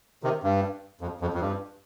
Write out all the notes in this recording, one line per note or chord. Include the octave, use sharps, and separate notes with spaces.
C3 D#3
G2
F2
F2
F2
G2